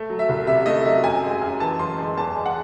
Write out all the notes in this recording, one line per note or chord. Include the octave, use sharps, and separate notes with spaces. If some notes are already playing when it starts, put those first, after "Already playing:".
Already playing: A3
F#3
E5
C2
C3 E5
A3 D#5
F#3 E5
F#2 G#5
G#3
F#2
E3 A5
F#2 C6
G#3
E2 A5
G#3
F#5